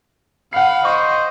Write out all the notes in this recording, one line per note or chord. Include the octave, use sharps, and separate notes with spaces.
F5 F#5 B5 C7
C5 D#5 C#6